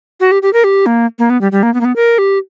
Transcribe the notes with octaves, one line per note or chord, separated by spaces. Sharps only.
F#4
G4
G4
A#4
G4
A#3
A#3
B3
G3
G3
A#3
B3
A#3
B3
A#4
G4